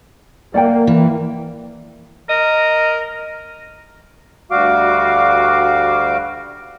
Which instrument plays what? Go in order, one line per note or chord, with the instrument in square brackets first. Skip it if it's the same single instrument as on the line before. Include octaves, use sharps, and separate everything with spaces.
[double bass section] A#3 [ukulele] D5 F#5 G5
[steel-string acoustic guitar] E3
[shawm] A#4 [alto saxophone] D#5
[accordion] D2 G3 F#4 F5 D6